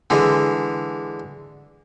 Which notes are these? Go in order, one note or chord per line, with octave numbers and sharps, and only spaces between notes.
D3 E3 G#3